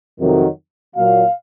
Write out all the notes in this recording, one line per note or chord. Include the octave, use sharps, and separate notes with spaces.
F2 C3 D#3 F#3
A#2 F#3 F5